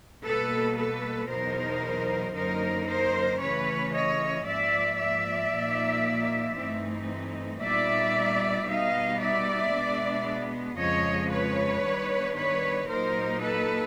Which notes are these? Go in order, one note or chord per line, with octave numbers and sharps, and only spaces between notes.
B2 G3 A#3 A4 B4
A4 B4
E2 B2 F#3 B3 D#4 A#4 C5
F#2 D3 F#3 A#3 D#4 A#4 C5
A#4 C5
C#3 E3 A3 C#4 B4 C#5
C#5 D#5
G#2 F3 A#3 D5 E5
D5 E5
A#2 F3 A#3 D#4
G2 E3 A3 C4 D#4
A#2 G3 B3 D#4 D5 E5
B2 G3 B3 D#4 D#5 F5
D5 E5
B2 G#3 B3 D4
F2 C#3 F3 G#3 C#5 D#5
B4 C#5
D#3 G3 B3 D4
B4 C#5
A#2 F#3 A#3 D#4 A#4 C5
A4 B4